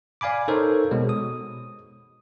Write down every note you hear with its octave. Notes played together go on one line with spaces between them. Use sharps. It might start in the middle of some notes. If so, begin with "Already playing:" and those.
D5 F5 G#5 B5 D6
D#4 A4 A#4 C5 C#5
B2 G#3
D#6